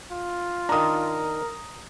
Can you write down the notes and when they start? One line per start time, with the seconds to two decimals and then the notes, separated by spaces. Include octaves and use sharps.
0.12 F4
0.69 D#3 D4 A#4 A#5 D#6